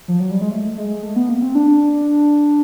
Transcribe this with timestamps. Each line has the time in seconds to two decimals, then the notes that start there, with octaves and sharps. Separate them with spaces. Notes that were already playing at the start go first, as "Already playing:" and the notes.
0.08 F3
0.20 F#3
0.31 G3
0.41 G#3
0.51 A3
0.78 G#3
1.03 A3
1.16 B3
1.29 A#3
1.42 C4
1.55 D4